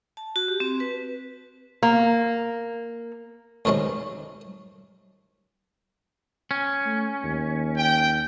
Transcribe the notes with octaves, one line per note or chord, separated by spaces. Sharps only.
A5
F#4
G4
C4
B4
A#3
D2 C3 D#3 G#3 C#4
C#4
A3
D#2
G5